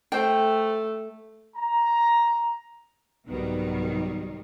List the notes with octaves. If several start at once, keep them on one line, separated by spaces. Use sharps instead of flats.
A3 C5 G5
A#5
C2 G#2 D#3 F#3 G3 B3